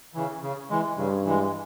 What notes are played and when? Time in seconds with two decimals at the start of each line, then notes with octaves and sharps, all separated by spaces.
0.14 C#3 E3
0.42 C#3
0.70 E3 G#3
0.97 G2 C#3
1.25 E3 G#3